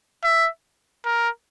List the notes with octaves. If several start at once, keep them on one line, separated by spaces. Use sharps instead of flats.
E5
A#4